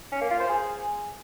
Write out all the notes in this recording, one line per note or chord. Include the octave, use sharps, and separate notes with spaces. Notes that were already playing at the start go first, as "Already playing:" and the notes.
C#4
A#3
F4
C5
G#4